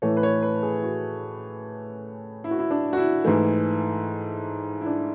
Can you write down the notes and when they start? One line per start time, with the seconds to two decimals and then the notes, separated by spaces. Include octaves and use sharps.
0.02 A2 E3 A3 C#5
0.17 B4
0.23 C#5
0.43 B4
0.63 G#4
0.83 F#4
2.44 E4
2.51 F#4
2.59 E4
2.71 D4
2.93 F#4
2.97 E4
3.24 G#2 E3 A3
4.81 E4
4.86 D4